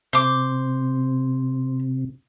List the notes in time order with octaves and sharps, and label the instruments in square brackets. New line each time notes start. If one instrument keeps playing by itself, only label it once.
[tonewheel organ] C3 [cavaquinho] C5 D6